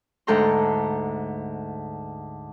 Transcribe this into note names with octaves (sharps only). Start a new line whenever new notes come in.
D2 G#2 A4 G5 A#5 C6